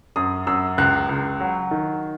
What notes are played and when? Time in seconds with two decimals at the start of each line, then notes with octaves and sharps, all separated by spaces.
0.16 F#2 D#6
0.47 F#2 E6
0.78 C#2 F#6
1.09 C#2
1.40 F#3
1.71 D#3